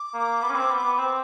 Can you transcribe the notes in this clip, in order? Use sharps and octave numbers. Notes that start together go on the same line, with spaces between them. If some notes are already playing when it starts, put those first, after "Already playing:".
Already playing: D6
A#3
B3
C#4
C4
B3
B3
C4